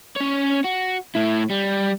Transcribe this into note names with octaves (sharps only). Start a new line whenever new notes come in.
C#4 C#5
F#4
A2 E4
G3